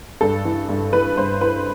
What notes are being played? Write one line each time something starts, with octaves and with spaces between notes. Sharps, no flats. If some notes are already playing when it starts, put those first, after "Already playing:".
G2 A4
E3
G2
E3 B4
G2 C5
E3 B4